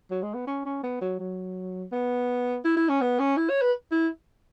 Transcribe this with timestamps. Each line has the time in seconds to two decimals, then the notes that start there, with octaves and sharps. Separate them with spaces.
0.10 F#3
0.23 G#3
0.34 B3
0.47 C#4
0.65 C#4
0.83 B3
1.01 F#3
1.20 F#3
1.92 B3
2.65 E4
2.77 E4
2.89 C#4
3.01 B3
3.19 C#4
3.37 E4
3.49 C#5
3.61 B4
3.91 E4